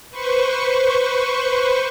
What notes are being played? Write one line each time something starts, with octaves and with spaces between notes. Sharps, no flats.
B4 C5 C#6